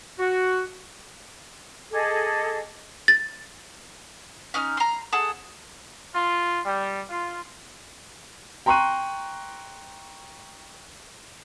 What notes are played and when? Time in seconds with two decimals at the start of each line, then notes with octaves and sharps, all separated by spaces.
0.19 F#4
1.91 G#4 A4 D#5 D6
3.08 A6
4.54 C#4 D#4 F6
4.77 A#5 C6
5.13 G#4 A4 F#5
6.15 F4
6.66 G3
7.10 F4
8.66 G5 A#5 C6 C#6 F#6 D#7